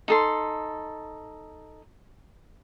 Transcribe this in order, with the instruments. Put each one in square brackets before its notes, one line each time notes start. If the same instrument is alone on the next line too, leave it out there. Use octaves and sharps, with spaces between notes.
[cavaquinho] D#4 A4 C6